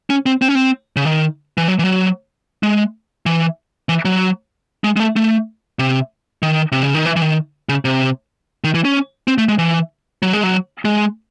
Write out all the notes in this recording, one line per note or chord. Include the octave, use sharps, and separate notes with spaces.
C#4
C4
C4
C#4
C4
C#3
D#3
E3
F#3
E3
F#3
G#3
E3
E3
F#3
G#3
G#3
A3
A3
C3
D#3
C3
C#3
D#3
E3
E3
D#3
C#3
C3
D#3
E3
C#4
C4
A3
G#3
E3
F#3
G#3
F#3
G#3